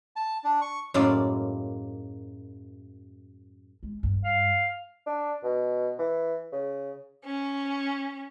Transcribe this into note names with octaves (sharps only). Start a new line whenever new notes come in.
A5
D4
C#6
F#2 A2 G#3 A#3 F4 D5
G#3
G2
F5
D4
B2
E3
C#3
C#4